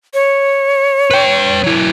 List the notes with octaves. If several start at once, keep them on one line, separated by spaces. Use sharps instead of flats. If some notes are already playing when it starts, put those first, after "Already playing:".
C#5
B4 G5
F#3 E4